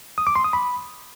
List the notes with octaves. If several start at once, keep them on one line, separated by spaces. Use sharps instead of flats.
D#6
D6
C6
D#6
B5